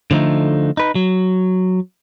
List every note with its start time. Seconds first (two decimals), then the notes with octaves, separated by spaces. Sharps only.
0.11 D3 F3 A3 D#4
0.77 D#4 B4
0.95 F#3